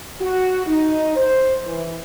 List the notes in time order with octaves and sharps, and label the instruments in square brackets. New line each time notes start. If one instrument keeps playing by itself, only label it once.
[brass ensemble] F#4
D#4
C5
E3